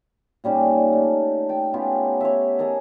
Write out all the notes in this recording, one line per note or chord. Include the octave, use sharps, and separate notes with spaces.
A#2 G3 C#4 D#4
A3
G5 A5
B3 C#4 F4 G4
C#5 E5
G#4 A#4 D#5 A5